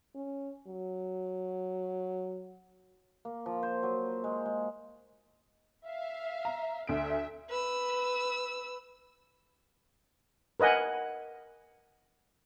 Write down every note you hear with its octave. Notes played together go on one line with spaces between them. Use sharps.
C#4
F#3
A#3
F3
C5
F#3
G#3
G#3
E5 F5
A#5
D2 E5 D7
B4 E6
A#4 B4 D#5 F#5 G#5